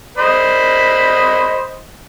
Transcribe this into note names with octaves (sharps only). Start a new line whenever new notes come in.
C5 D#5 B5